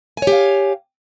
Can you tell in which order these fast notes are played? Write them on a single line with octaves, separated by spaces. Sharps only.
G#5 C#5 G4 F5